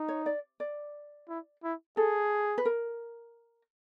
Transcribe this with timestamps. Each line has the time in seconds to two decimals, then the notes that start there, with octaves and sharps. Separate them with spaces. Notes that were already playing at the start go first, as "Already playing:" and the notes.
Already playing: D#4
0.08 C#5
0.26 D5
0.60 D5
1.28 E4
1.63 E4
1.97 G#4 A4
2.58 B4
2.65 A#4